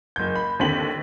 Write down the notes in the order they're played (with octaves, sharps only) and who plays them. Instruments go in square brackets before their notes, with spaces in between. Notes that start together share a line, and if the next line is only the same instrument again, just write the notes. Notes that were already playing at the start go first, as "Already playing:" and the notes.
[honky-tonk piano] F#1 G6
B5
D#2 D3 C4 G5 B6 F#7